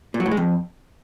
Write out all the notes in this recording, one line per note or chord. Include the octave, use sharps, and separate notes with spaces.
A#2
F#3
A2
G#3
F2